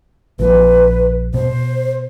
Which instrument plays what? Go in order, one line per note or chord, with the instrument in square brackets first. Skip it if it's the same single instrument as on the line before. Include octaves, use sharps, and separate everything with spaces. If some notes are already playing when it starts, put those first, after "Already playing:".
[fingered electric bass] A#1 F3 [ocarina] B4
[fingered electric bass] B2 [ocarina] C5